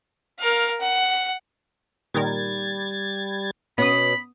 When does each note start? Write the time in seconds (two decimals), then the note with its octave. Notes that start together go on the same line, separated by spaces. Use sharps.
0.39 A#4 F5
0.80 F#5
2.14 A#2 D#3 G3 A#4 G#6 A6
3.78 B2 B3 C#4 F#5 B5 D#6